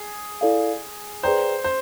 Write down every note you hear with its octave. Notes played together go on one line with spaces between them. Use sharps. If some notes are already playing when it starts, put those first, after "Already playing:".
Already playing: G#4
E4 A4 D5 F5
G#4 B4 C5 D5 G5 A#5
C5